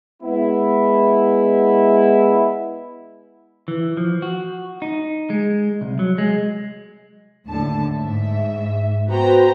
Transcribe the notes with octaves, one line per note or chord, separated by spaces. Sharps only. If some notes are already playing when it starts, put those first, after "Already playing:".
G#3 B3 E4
E3
F3
F#4
D#4
G#3
C2
F#3
G#3
D#2 A2 D3 A5
G#2 E5
B3 F#4 B4 C5 G5 A#5